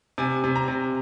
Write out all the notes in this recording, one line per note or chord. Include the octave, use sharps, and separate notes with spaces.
C3 G#5
C3
A#5
C3